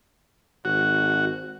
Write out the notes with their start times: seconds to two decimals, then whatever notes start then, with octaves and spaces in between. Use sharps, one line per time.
0.65 G#1 F#4